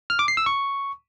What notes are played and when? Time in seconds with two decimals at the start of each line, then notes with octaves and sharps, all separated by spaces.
0.10 F6
0.19 D6
0.28 C7
0.37 E6
0.46 C#6